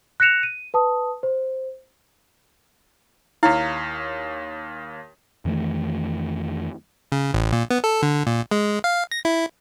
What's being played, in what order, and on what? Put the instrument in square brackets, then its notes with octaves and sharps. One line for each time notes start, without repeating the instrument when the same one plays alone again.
[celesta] F#6 A#6 C#7 E7 F7
D#7
B4 A5 D#6
C5
[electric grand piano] D#2 C#5 F5 [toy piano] E4
[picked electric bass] F2 D#3 E3 A3
[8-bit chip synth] C#3
A1
A#2
B3
A4
D3
A#2
G#3
F5
A#6
E4